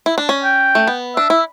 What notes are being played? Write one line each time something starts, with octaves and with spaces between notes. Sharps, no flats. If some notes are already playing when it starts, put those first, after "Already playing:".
E4
D4
C#4
G5
A3
B3
D4 E5
E4 E5